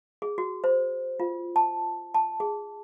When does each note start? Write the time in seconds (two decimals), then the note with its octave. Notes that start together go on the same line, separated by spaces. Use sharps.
0.22 G#4
0.38 F#4
0.64 C5
1.20 F4
1.56 A5
2.14 A5
2.40 G#4